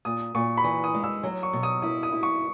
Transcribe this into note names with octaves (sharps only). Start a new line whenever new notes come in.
A#2 D#6
A#2 C#6
B5
E3 C#6
D#6
G#3
E6
F#3
C#6
B2
D#6
E4 D#6
D#6
E4
C#6